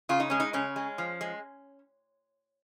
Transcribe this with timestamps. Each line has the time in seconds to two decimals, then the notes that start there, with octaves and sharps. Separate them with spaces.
0.09 C#3 F4
0.20 D#4
0.30 G#3 C#4
0.40 D#4
0.53 C#3 C#4
0.76 G#3
0.98 F3
1.21 G#3